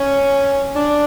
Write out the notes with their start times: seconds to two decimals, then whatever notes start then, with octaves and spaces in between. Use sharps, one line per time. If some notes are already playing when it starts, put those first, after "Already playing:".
Already playing: C#4
0.75 D4